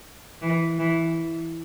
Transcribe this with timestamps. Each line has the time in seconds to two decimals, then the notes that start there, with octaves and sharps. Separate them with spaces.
0.42 E3
0.79 E3